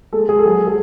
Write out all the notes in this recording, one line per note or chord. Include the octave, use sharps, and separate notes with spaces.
G#3 A4
G#3 G#4
A4
F#3 G#4
G#4